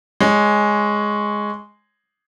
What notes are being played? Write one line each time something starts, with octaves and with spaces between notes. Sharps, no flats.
G#3 C#5